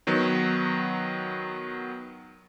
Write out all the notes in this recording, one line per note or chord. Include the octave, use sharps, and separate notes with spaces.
D#3 F#3 B3